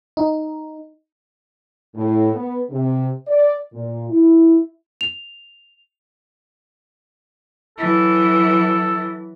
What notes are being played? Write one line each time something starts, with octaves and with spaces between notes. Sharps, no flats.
D#4
A2
B3
C3
D5
A#2
E4
F7
E3 F#3 A4